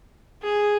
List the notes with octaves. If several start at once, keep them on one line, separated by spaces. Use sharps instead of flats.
G#4